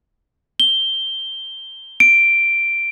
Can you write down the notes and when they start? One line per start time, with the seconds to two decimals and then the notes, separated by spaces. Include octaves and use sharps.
0.60 G7
2.00 D7